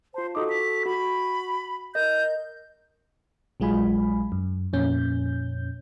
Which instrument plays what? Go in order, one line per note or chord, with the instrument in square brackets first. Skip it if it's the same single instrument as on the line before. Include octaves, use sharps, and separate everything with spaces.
[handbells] F4 A5 [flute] C5
[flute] D#4 [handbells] F#4 A4 D6
[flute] B6
[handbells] F#4 [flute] B5
[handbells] A#4 D#5 [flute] G6
[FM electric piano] A#1 F#3 G#3 F4 G#5 B5
F#2
F2 A#2 C#4 G6